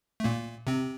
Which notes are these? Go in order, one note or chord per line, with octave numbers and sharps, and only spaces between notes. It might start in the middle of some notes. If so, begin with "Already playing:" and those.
A3
A#2 A#3
C3 C4